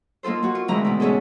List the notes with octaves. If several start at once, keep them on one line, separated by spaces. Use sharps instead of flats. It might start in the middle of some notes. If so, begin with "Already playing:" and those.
A#3 D#4 F4 A4 C5
A#3 F#4
F4
D2 E3 G#3 C4 E4 A#5
B2 E4
G#2 C#4 G#4 A4